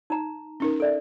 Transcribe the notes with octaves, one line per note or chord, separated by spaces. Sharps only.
D#4 A#5
C#4 D#4 A#4
A4 D5 E5